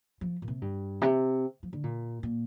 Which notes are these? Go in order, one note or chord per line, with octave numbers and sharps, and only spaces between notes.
F3
A#2
C3
G2
C3
F3
D3
A#2
A#2